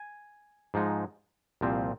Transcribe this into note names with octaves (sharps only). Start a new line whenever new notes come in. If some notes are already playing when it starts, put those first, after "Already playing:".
Already playing: G#5
G#2 F3 G#3 D#4
C2 A#2 F3 C4